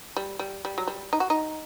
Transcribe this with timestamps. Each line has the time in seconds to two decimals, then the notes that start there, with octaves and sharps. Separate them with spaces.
0.17 G3
0.39 G3
0.65 G3
0.78 F#3
0.87 G3
1.13 D#4
1.20 F#4
1.30 D#4